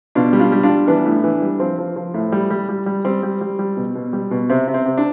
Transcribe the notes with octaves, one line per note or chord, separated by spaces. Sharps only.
B2 D4 F4
G3
D4 F4
G3
D4 F4
G3
E3 B3 D4
A2
E3
G3
F3 C4
F3
F3
A2
G3
G3
G3
G3
G3 C4
G3
G3
G3
B2
B2
G3
B2
C3 C4
C3
C4
C3
D4